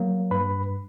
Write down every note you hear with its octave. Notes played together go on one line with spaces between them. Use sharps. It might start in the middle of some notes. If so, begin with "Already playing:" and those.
Already playing: F#3 A#3
G2 B4 B5